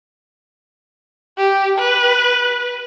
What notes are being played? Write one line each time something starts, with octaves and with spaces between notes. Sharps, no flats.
G4
B4